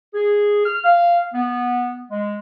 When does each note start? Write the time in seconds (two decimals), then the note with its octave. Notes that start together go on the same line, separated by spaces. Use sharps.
0.14 G#4
0.65 F6
0.84 F5
1.33 B3
2.11 G#3